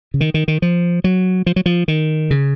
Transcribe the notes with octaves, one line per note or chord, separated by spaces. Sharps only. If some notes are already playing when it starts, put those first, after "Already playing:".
C#3
D#3
D#3
D#3
F3
F#3
F3
F#3
F3
D#3
C#3